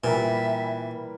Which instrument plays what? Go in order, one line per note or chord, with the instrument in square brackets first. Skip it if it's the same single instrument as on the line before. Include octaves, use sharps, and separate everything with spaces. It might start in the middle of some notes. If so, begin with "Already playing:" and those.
[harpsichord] A#2 [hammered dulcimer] E3 G3 A#4 [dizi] E5